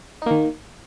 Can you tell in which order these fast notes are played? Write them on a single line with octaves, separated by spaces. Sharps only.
D#4 A#3 D#3